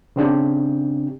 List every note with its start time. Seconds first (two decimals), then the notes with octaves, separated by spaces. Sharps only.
0.16 C#3 C4 D4 G4